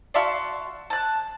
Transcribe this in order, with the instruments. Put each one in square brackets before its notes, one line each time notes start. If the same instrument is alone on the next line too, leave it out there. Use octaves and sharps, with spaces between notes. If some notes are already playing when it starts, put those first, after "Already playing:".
[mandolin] F#4 A5 C6 [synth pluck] D5 E5 F5
[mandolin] A5 F#6